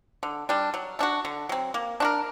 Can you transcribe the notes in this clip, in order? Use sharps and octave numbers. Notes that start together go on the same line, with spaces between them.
D3
G3 D4
F#3
A3 D4 F#4
D3
F#3 C4
A#3
D4 F#4 A#4